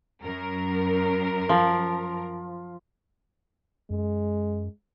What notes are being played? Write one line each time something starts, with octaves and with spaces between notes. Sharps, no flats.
F#2 A#4
F3
F#2 G#3